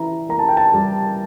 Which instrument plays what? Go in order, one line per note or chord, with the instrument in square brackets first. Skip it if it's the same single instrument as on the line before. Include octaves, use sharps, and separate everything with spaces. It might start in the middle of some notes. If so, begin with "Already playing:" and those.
Already playing: [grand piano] E3 E4 [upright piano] A#5
[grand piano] A#3 [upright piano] A#5
[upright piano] A5
G5
A5
[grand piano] G3